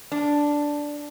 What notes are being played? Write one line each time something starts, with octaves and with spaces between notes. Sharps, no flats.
D4